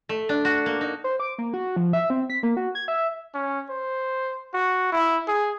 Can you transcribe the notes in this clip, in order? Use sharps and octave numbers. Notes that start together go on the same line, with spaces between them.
A3
D4
F#4
A#3
D#4
C5
D6
A#3
F#4
F3
E5
C4
B6
A#3
F#4
G#6
E5
C#4
C5
F#4
E4
G#4